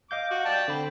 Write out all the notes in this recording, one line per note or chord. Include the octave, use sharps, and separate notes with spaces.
D#5 F5 D6 G6
F#4
D5 G5 A5
D3 C4 B5